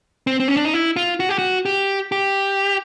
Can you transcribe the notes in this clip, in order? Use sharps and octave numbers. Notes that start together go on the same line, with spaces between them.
C4
C4
C#4
D4
D#4
E4
F4
F#4
G4
F#4
G4
G4